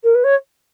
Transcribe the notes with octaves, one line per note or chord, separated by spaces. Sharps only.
A#4
B4
C#5